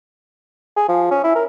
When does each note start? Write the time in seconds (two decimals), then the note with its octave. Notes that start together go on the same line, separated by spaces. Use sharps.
0.77 G#4
0.88 F3
1.11 C#4
1.23 E4
1.35 A#4